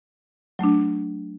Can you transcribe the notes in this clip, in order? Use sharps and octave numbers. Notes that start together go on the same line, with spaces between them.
F#3 A3 D4